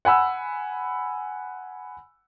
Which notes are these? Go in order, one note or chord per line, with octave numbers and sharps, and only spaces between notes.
F#5 G#5 B5 E6